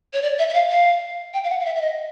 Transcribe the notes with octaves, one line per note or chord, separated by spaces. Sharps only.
C#5
D5
E5
E5
F5
F5
G5
F5
F#5
F5
E5
E5
D#5